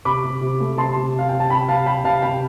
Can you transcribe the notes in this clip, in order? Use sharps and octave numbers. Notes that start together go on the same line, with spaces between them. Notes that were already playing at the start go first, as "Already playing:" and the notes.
C3 B5 D6
C3
C3
A3
C3 A5 C6
C3
C3 F5
C3 G5
A5
C3 G5 B5
C3 F5 A5
C3 G5 B5
C3 F5 A5
C3 G5 B5